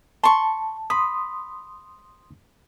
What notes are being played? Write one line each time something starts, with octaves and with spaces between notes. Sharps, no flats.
A5 C6 C#6
B5 C6 D#6